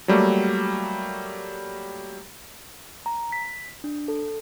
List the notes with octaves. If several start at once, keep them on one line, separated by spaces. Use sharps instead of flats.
F#3 G3 A3 A#3
A#5
B6
D4
A4